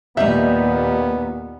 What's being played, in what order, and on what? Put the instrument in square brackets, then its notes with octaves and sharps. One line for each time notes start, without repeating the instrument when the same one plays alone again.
[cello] D#2 A#2 [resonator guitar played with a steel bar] G3 D#4 [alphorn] B3 [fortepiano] E5